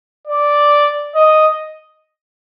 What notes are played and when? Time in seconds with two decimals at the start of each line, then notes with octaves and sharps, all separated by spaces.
0.27 D5
1.15 D#5